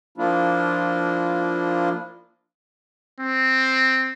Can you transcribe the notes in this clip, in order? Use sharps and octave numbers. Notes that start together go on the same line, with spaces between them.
F3 A#3 D4 E4 F4
C4